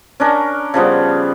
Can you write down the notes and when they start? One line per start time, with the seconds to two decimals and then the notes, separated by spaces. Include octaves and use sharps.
0.20 C#4 D4 A#4
0.74 C#3 F3 G3 B3